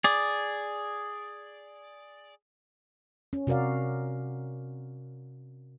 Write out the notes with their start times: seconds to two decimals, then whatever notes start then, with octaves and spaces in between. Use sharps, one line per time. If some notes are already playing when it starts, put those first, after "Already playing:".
0.04 G#4 D5
3.33 C#4
3.47 C3 F#4 A#4 D5 F5